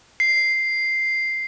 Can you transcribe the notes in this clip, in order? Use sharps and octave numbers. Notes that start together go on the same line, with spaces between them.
C7